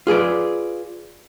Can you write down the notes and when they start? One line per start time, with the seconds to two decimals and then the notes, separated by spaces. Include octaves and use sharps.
0.07 F4 G#4 B4 D5